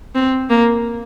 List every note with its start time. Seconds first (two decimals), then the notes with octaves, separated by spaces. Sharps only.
0.15 C4
0.50 A#3